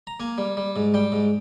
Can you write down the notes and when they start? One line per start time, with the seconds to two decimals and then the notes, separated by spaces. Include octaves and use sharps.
0.07 A#5
0.20 A#3 G#5
0.38 G3
0.57 G3
0.76 G#2
0.94 G3 G5
1.12 G#2